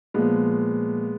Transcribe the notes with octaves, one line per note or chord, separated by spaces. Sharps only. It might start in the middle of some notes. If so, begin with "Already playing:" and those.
A#2 F3 G#3 B3